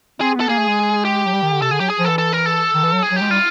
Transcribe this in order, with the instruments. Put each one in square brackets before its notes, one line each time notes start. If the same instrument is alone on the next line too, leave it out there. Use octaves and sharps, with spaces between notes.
[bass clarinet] C4 [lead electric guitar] G#4
[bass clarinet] B3 [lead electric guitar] A4
[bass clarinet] A#3 [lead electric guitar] G#4
[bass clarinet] A3
G#3
[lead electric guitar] G4
[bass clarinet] F#3
G3
D#3
D3
[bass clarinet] C3 [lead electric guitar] A4
[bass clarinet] D3 [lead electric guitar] G#4
[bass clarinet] F#3 [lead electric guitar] G4
[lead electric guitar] G#4
[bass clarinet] F3
[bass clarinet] E3 [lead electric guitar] A4
[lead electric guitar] A4
A#4
A4
[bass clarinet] D#3
E3
F#3
[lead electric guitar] G#4
[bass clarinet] F#3
[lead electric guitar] G4
[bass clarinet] G#3
[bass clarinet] G3 [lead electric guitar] F4